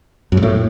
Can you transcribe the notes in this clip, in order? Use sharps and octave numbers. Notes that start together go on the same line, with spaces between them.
F#2
G#2
A2